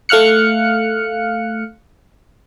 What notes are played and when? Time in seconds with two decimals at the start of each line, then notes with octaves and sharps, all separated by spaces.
0.09 A3 F5 F6 F#6 C#7